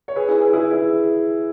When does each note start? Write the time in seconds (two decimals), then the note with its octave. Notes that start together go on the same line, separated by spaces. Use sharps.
0.08 C#5
0.16 G#4 B4
0.28 E4 G#4
0.40 G#4 B4
0.53 E4 G#4
0.71 E4 G#4